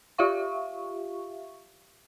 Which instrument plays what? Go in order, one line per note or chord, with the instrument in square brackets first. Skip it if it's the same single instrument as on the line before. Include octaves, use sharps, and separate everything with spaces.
[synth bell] F4 G4 E5 F5 C#6